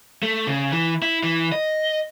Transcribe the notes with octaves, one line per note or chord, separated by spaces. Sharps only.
A3
C#3
E3
E4
E3
D#5